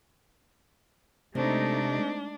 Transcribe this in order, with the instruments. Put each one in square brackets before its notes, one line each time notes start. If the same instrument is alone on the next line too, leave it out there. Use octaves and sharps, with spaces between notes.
[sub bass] C3 [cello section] G#3 A3 D#4 [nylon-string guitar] C4 [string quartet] D4